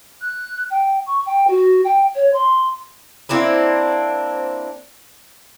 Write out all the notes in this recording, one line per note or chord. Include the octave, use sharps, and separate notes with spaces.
F#6
G5
C#6
G5
F#4
G5
C#5
C6
A#3 C4 D4 E4